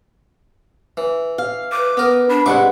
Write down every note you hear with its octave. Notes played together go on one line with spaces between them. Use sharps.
E3
F5
B4 D6
B3 A#4
D4 B5
C2 G#3 B4 E5 F#5 C#6 D6